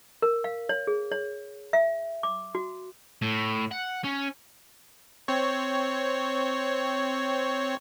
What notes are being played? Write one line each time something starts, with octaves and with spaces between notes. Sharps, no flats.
A#4
F5
C#5
G#4
C#5
E5
D6
F#4
A2
F#5
C#4
C4 C#5